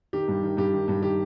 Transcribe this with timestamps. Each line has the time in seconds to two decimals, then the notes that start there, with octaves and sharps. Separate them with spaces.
0.13 D#3 G4
0.28 G2
0.43 D#3
0.57 G2 G4
0.73 D#3
0.88 G2
1.02 D#3 G4